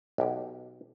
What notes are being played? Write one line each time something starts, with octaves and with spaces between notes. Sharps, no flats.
B1 G4